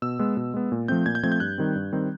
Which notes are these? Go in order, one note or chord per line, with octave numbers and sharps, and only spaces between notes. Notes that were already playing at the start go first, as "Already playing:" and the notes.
B2 E6
G#3 B3
B2
G#3 B3
A#2
F3 A3 C4 G6
A#2 G#6
G6
F3 A3 C4 G#6
G6
G2 F#6
D#3 G3 C4
G2
D#3 G3 C4